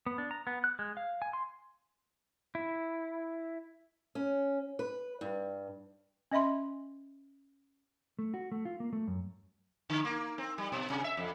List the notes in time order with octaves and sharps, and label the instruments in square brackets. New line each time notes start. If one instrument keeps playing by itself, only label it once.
[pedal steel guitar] B3
D4
A#5
B3
F#6
G#3
F5
G#5
C6
E4
[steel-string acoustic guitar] C#4
B4
G2
[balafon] C#4 D#5 E5 B5 C6
[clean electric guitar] A3
F#4
A3
F4
A#3
A3
F#2
[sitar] D3
A#3
C4
G3
B2
C3
E5
F2